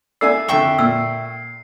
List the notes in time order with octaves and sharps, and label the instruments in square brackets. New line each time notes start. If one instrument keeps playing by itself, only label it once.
[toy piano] C#4 A4 E6 [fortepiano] D5 E5 G#5 [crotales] C7
[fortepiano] F2 D3 [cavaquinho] E5 G5 C#6
[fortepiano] A#2 [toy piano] E6